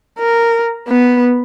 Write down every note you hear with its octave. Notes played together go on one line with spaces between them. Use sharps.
A#4
B3